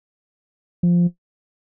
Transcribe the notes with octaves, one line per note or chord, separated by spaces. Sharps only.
F3